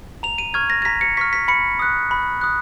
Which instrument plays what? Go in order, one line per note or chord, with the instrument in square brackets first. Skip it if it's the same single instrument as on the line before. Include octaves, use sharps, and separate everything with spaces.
[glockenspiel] A#5 F7
D#7
C#6 F6 G#6
A#6
A#6
A#5 B6
C#7
C#6 F6 B6
B6
B5 C#7
D#6 F#6
B5
D#6 F#6